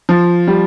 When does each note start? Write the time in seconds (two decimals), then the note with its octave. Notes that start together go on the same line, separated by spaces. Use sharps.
0.09 F3
0.47 G3